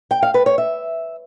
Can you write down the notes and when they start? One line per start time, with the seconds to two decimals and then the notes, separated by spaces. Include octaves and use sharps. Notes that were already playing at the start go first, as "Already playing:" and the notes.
0.11 G5
0.22 F5
0.34 B4
0.46 C#5
0.58 E5